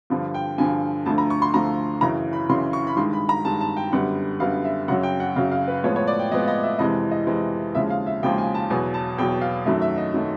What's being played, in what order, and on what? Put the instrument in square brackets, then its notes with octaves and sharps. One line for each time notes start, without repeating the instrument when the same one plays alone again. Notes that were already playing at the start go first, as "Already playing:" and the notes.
[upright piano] G2 D3 F3
G5
G2 D3 F3 G#5
D2 D3 F3 A3 A5
A#5
C#6
C6
D2 D3 F3 A3 A#5
F#2 C#3 E3 A#5
B5
F#2 C#3 E3 C6
C#6
B5
G2 D#3 G#3 C6
B5
A#5
G2 D#3 G#3 A5
A5
G5
F#2 D3 G3 B3 F#5
F#2 D3 G3 B3 F5
E5
F#2 C#3 F#3 F#5
G5
F#5
F#2 C#3 F#3 F5
F5
B4
A2 F3 G#3 B3 C#5
C#5
D5
G5
A2 F3 G#3 B3 D#5
D#5
E5
F2 C3 E3 G#3 D#5
D#5
F2 C3 E3 G#3
D#2 C#3 F3 G#3 E5
F5
E5
D#2 C#3 F3 G#3 G5
G#5
A5
E2 B2 F#3 G#5
A5
E2 B2 F#3 G5
F5
F#2 D#3 F#3 A3 E5
E5
D#5
D#3 F#3 A3